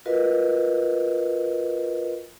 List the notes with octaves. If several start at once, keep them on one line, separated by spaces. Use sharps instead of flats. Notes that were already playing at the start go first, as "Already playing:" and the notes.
F4 F#4 A#4 B4 D#5 F5